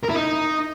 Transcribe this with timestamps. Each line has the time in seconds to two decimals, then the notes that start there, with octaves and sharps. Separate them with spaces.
0.05 A#4
0.10 E4
0.16 D#4